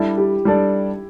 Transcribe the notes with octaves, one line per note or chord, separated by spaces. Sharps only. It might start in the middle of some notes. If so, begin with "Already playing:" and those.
Already playing: G3 D4 E4 A4 D5
G4
G3 D4 A4 D5